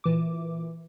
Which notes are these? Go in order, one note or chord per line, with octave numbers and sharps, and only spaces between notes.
A#2 E3 D6